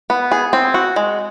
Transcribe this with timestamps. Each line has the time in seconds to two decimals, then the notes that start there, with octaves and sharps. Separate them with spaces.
0.10 B3
0.31 G#4
0.53 C4
0.74 F#4
0.96 G#3